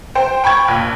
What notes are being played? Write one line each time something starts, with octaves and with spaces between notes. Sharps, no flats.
C5 G5
G5 B5 C#6 G#6
A#1